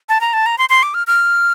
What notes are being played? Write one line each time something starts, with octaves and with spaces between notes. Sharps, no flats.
A5
A#5
A5
A#5
C6
C6
D6
F6
F6